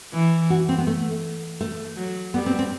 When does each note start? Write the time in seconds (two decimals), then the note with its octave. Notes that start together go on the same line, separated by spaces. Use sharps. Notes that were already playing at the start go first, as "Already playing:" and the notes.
0.13 E3
0.50 F#4
0.69 C4
0.78 B3
0.87 A3
1.61 A3
1.97 F#3
2.34 G3 B3
2.46 C4
2.59 C4